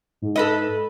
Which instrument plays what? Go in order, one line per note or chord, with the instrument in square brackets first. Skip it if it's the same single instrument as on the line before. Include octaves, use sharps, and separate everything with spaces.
[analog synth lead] G#2
[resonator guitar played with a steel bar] A4 B4 D#5